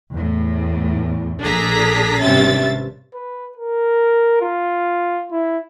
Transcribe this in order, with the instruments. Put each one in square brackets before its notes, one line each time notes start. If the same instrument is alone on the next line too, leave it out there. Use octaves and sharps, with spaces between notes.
[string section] E2 A2
A#1 D4 G#4 A4 A#5 B6
G#1 G2 C3 C#4 E5 A6
[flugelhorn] B4
A#4
F4
E4